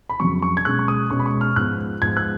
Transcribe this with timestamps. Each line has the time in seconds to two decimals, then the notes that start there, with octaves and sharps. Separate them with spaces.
0.10 B5
0.20 F2 C#3 F#3 C#6
0.42 C#6
0.57 G#6
0.65 B2 G#3 C#4 F#6
0.79 C#6
0.88 D#6
1.10 B2 G#3 C#4 C#6
1.19 B5
1.26 C#6
1.41 F6
1.56 G#2 F3 B3 F#6
2.02 G#2 F3 B3 G#6
2.17 F#6